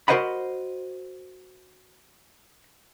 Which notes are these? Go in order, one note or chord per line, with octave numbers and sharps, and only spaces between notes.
F#4 A#4 C5 D#5 F#5 B5